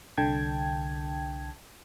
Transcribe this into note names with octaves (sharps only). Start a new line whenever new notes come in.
C2 D3 G5 A5 G#6